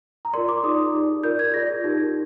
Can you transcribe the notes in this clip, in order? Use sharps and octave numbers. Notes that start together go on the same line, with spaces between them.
A#5
F4 A#4 D5 C6
D6
D#4 G#4 D5 D#6
D#4 G4 D5
F4 A#4 D5 G6
G#6
F4 G#4 D5 A#6
D#4 G4 A#4